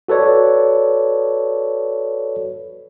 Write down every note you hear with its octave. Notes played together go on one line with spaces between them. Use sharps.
F#4 A4 B4 C#5 D5